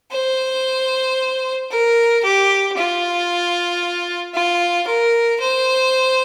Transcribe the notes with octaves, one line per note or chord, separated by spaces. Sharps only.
C5
A#4
G4
F4
F4
A#4
C5